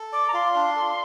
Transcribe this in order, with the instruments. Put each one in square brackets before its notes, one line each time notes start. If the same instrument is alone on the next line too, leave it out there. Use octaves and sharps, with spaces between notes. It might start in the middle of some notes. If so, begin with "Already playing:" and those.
Already playing: [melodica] A4
[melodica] D5 [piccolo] D6
[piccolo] A#5
[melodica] F4 [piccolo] C6
[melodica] D4
A4